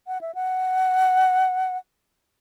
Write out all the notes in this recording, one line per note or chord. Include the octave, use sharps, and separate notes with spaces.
F#5
E5
F#5